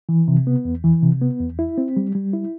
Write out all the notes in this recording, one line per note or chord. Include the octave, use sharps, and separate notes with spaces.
E3
C3
B3
E2
E3
C3
B3
E2
E4
C4
G3
G3
E4